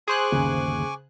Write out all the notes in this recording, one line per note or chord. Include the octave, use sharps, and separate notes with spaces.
G#4 C5 G#5 C#6 D6 F#6
G1 D#2 C#3